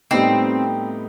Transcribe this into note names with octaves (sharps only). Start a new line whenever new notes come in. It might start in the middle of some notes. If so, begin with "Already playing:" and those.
A2 G3 B3 C4 D#4